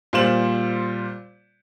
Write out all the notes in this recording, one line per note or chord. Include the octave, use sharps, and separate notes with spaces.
A#2 G3 F4 C5 E7 F#7